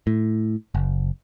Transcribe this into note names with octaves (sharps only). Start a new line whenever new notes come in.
A2
F#1